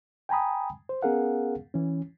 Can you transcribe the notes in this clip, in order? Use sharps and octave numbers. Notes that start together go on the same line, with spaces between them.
G5 G#5 A#5 B5 D#6
C5
B3 C#4 G#4 A#4 F5 F#5
E3 C#4